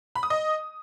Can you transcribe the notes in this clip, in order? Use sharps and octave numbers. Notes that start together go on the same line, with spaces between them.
B5
D#6
D#5